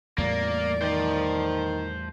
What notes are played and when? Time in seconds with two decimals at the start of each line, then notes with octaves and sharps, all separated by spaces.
0.18 E2 A2 G3 A#3 D5
0.82 D#3 C5 A5